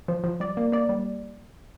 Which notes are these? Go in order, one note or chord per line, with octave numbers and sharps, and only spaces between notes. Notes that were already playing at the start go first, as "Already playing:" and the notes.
F3
F3
G3 D5
A#3
A#3 D5
G3